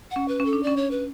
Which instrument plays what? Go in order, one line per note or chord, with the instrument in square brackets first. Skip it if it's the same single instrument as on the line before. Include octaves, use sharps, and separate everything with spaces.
[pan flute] F#5
[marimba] C#4
[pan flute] B4
[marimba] C#4
[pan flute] A4
[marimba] D4
[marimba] C#4 [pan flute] D5
[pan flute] C#5
B4